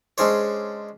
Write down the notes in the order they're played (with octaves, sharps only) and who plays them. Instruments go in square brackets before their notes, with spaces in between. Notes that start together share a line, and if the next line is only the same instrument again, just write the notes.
[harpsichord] G#3 C#4 D4 C5 C#5